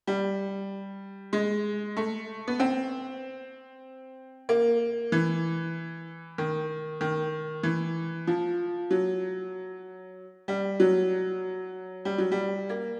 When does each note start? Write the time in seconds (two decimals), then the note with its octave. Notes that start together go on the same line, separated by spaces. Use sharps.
0.07 G3
1.33 G#3
1.97 A3
2.48 B3
2.60 C4
4.49 A#3
5.12 E3
6.38 D#3
7.01 D#3
7.63 E3
8.27 F3
8.91 F#3
10.48 G3
10.80 F#3
12.05 G3
12.18 F#3
12.32 G3
12.69 A#3